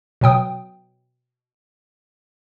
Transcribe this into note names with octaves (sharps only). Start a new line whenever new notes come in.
B2 F#3 G5 D#6